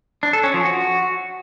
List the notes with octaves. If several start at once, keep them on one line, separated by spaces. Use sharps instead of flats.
D4
A4
C#4
F3
F#4